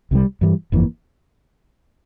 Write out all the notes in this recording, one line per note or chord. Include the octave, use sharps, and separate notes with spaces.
C2 C3 G3
G2 E3 G3
G1 F2 E3 A#3